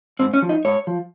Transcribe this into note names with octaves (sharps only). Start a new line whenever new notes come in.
G#2 C4
C#4
F3
D#4
G#2 C#5
F3